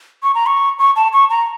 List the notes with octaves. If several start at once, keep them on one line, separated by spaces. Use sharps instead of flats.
C#6
A#5
C#6
C#6
A5
C#6
A#5